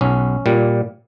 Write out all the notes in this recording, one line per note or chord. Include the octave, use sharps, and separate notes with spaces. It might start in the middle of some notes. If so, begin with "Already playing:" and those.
B1 C#4
A#2 G3